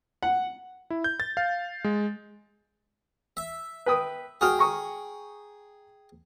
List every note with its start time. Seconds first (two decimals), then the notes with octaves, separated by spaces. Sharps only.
0.23 F#5
0.90 E4
1.04 G6
1.20 A6
1.37 F5
1.84 G#3
3.37 E5
3.86 B4 G5 D#6
4.41 F#4 G#4 G5 D#6 F6
4.59 A#5 C#6 D#6